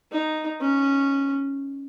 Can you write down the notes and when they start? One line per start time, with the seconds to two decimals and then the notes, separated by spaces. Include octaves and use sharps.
0.12 D#4
0.61 C#4